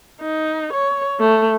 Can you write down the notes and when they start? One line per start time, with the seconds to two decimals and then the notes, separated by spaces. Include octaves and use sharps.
0.21 D#4
0.73 C#5
1.19 A3